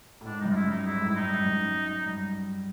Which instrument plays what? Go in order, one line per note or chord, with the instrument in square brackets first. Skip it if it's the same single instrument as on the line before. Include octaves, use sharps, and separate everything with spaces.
[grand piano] A2
[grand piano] G#2 [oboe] D4
[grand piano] G2 [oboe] D#4
[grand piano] F#2
[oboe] F4
E4
[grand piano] G2
[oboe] D#4
[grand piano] G#2 [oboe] E4
[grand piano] A2
[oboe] E4
[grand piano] G#2 [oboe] D#4
[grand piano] G2
F#2
G2